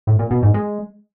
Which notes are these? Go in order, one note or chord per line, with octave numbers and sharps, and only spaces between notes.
A2
A#2
B2
G#2
G#3